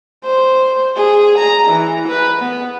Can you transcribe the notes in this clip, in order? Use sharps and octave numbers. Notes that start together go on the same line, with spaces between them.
C5
G#4
A#5
E3
B4
B3